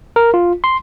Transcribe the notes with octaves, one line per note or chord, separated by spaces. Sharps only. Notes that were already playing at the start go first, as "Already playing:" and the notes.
A#4
F4
C6